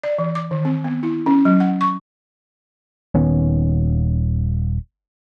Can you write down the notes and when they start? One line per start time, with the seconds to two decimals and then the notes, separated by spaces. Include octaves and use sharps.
0.04 D5
0.18 E3
0.35 D6
0.51 D#3
0.65 C4
0.84 B3
1.03 E4
1.26 C#4
1.45 F#3
1.60 F#5
1.81 C#6
3.15 D#1 D#3 B3 C#4